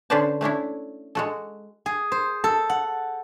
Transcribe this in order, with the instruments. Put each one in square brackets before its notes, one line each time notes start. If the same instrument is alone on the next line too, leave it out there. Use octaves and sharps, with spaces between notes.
[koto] D3 C#4 B4 C5 D5 A5
A3 C#4 D4 E4
G#3 F#4 A4
[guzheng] G#4
C5
A4
F#5